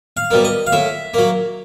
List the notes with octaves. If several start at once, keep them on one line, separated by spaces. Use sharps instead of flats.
F5
B2 G3 A#3
D#5
F5
A2 E5
F#3 A#3